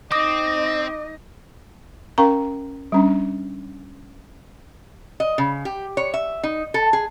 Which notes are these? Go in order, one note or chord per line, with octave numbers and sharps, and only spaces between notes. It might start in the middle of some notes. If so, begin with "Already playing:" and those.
C4 D#4 D#5 D6 D#6 A#6
C#4 A#4 F5 G5 A#5 C#6
G3 C#4 D4
D#5
C#3
G4
C#5
E5
D#4
A4
G#4